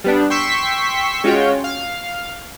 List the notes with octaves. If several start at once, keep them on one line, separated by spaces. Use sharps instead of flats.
G3 B3 D4
G5 C6 C#6 E6 B6
G#3 C#4 F4 F#4 C#5 G5
F5